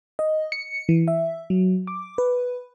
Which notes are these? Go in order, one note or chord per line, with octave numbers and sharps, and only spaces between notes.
D#5
C#7
E3
E5
F#3
D6
B4